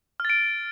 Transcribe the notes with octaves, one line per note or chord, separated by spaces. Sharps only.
F6 A6 D7